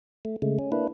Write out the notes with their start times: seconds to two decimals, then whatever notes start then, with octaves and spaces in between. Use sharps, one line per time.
0.25 A3
0.42 C#3 G#3 A3
0.59 C#4
0.72 A#3 D4 E4 B4